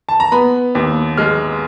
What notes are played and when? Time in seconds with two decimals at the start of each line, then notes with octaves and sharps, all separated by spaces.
0.09 A5
0.20 A#5
0.32 B3 B5
0.75 D#2
1.18 G#3 F6